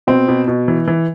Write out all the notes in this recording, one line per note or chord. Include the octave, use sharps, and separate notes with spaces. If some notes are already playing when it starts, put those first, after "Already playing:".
B2 C4
B2
B2
E3
E3